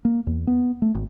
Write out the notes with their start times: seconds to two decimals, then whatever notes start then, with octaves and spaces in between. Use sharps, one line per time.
0.05 A#3
0.27 E2
0.47 B3
0.82 A3
0.95 G#1